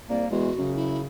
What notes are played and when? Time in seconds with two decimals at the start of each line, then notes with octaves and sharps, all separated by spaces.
0.09 C2 A#3 D5
0.31 E2 G#3 F#4
0.58 F#2 C#3
0.75 E4